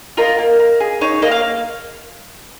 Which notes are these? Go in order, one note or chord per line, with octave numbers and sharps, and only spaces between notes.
F4 A#4 D#5
A#3
A#3
G#4
D#4 C#5
A#3 D#5
F5